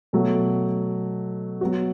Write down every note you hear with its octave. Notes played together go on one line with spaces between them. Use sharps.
B2 F#3 A3
F#3 B3 F#4